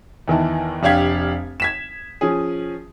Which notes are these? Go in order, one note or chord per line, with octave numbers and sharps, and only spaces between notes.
E2 D#3 E3 A5
F1 D4 G4 F5 G#6 B6
G#6 B6 E7
F3 C#4 G#4